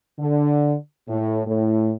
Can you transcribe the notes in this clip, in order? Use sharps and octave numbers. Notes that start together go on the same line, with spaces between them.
D3
A2
A2